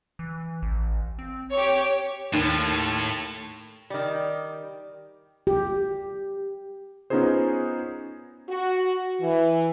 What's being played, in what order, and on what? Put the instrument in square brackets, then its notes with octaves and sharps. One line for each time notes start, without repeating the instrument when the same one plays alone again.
[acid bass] E3
A1
C4
[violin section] G4 C#5
[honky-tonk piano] D#2 [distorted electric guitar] A2
[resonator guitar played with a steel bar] D#3 G3
[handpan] G4
[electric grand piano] B3 C#4 D#4 F4 G#4 C5
[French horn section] F#4
E3